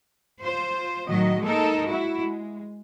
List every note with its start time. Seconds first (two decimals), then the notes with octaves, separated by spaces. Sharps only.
0.42 F4 C5
1.08 A2 D#3 F#3 F#4 D#5
1.42 G#3 A#3 D#4 A4 A#4
1.85 E4 F#4
2.22 G#3